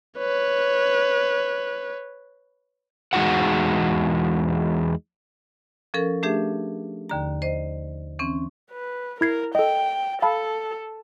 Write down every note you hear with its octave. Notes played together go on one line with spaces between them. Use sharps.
B4 C#5
E2 G#3 D#4 F#4 A4 F#5
F3 C#4 A4 A#4
A3 D4 G4 G#4 E5
D#2 D3 A#5
C5 D#5
E3 C4 C#4
B4
E4 A#4 G#6 C7
A4 D#5 G5
A4 F5 A5 B5